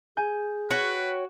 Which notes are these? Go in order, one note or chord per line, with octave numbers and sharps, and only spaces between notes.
G#4 G#5 G6
F#4 B4 C#5 G5 F#6